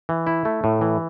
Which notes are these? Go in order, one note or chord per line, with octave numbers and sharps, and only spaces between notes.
E3
E4
A3
A2
E3